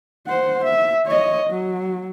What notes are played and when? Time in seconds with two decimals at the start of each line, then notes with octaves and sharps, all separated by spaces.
0.27 C5 F#5
0.64 E5
1.06 C#5 D#5
1.49 F#3